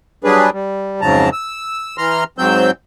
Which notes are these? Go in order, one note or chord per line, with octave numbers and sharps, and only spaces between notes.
F#3 G3 D4 G#4 B4
G3
F2 G#2 C#3 F#3 A5 A#5
E6
E3 A#5 C6 F6
G#2 F#3 C4 E6 G6